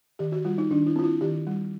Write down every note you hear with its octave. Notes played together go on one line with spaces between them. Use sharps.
D#3 G4
F#4
G3 F4
D#4
D#3 D4
E4
C4 F4
E4
D#3 G4
G3